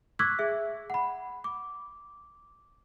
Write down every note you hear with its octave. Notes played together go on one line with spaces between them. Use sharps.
C#6 D6 E6 F#6 G#6 B6
G#4 E5
F#5 B5
D6